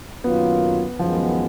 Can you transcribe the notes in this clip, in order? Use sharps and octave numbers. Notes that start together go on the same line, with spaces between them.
F#2 D#3 F#3 A#3 B3 F4
F#2 D#3 F3 G#3 B3